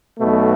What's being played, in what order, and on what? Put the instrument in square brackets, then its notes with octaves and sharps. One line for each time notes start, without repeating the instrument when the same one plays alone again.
[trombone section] B1 B2 A3